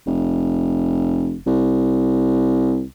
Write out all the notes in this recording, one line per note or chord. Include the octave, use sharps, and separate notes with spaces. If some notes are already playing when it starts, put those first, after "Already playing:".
F1
C2